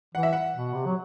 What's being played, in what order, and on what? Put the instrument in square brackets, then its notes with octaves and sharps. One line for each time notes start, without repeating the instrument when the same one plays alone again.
[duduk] E3 [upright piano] F#5
[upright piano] E5
F#5
[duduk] B2
C3
F#3